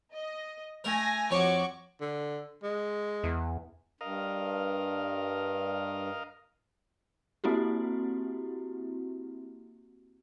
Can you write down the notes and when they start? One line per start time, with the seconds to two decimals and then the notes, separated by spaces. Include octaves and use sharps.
0.15 D#5
0.84 A3 A#4 G#5 A#6
1.31 F2 F#4 C#5 G#5 C#6 D6
2.01 D3
2.63 G#3
3.24 E2
4.01 G2 A#4 D#5 F5
7.44 A#3 C4 E4 F#4 G4